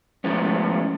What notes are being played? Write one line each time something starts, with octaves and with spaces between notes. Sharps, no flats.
D#3 F3 G#3 A3 B3 C#4